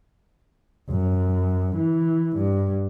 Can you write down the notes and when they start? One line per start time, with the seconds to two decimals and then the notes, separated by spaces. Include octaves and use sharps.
0.90 F#2
1.76 E3
2.37 G2